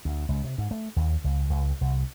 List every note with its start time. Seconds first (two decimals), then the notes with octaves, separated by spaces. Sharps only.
0.05 D2
0.29 C#2
0.44 C3
0.58 G#2
0.71 A3
0.96 D#2
1.24 C#2
1.50 C#2
1.81 C2